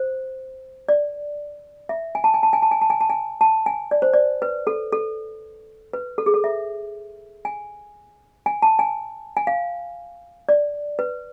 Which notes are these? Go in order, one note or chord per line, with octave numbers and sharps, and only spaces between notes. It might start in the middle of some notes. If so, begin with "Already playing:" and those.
Already playing: C5
D5
E5
G#5
A5
G#5
A5
G#5
A5
G#5
A5
G#5
A5
G#5
A5
G#5
D5
C5
D5
B4
A4
A4
B4
A4
G#4
A4
E5
G#5
G#5
A5
G#5
G#5
F5
D5
B4